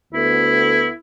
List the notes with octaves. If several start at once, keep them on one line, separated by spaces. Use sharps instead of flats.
D2 B3 E4 A4